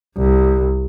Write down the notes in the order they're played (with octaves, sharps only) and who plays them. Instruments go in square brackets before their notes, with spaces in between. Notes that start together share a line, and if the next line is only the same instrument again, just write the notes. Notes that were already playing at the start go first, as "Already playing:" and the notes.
[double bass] C2